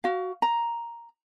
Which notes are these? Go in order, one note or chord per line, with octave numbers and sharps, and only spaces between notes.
F#4 F5
A#5